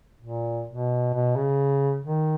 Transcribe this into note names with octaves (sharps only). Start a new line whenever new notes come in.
A#2
B2
B2
C#3
D#3